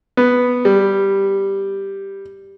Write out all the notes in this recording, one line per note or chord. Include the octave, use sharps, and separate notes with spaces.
B3
G3